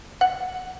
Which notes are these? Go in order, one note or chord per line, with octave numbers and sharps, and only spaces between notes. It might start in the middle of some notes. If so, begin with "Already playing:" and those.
F#5